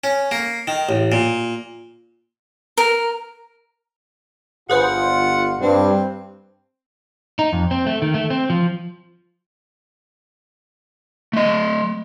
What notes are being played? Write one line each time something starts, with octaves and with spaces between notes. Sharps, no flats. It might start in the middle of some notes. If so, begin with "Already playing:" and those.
C#4
A#3
D#3
A1
A#2
A#4
G1 F4 G#4 B4 C5 F#5
G2 C4
D#4
F2
C4
A3
D#3
A3
C4
F3
A3 D#5